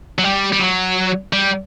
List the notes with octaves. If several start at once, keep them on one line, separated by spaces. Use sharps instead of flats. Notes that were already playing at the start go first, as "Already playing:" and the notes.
F#3
G3
G3
F#3
G3